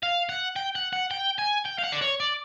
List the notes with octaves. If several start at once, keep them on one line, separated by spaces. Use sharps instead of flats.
F5
F#5
G5
F#5
F#5
G5
G#5
G5
F5
F#5
D5
C#5
D5